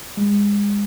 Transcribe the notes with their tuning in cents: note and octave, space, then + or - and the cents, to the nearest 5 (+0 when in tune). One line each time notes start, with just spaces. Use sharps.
G#3 -30